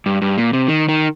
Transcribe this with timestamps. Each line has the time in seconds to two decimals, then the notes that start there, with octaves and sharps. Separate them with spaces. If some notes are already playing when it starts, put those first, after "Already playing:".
0.06 G2
0.22 G2
0.38 A#2
0.53 C3
0.68 D#3
0.89 D#3